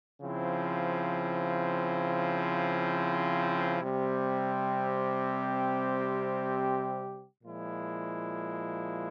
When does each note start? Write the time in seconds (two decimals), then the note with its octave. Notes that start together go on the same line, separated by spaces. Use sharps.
0.20 C#3 F3 C4 E4
3.81 C3 G3 C4 G4
7.42 A#2 F3 G#3 E4